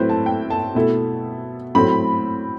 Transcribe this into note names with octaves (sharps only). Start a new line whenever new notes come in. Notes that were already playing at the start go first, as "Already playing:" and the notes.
Already playing: A2 F#3 C4 E4 B4 C5
A5
G5
A5
B2 A3 E4
A2 F#3 A3 C4 B5